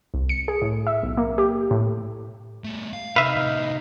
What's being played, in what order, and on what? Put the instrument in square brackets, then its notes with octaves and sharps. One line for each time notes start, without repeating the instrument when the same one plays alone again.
[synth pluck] C2
C#7
G#4
A2
E5
B1
A#3
G4
A2
[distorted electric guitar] G3 A3
F5
[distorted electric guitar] C3 [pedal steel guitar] D#4 F5 [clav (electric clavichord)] B4 E5
[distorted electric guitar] A2 C3